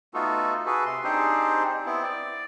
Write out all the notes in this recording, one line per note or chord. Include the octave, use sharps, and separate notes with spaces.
A3 B3 D#4 F4 F#4 A4
F#4 G#4 A4 B4
C3 C6
C4 D4 D#4 G4 G#4 C5
B3 C4 E4
D5